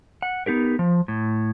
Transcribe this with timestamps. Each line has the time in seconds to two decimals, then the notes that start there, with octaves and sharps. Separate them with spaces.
0.22 F#5
0.46 B3 D#4 G4 A#4
0.79 F3
1.08 A2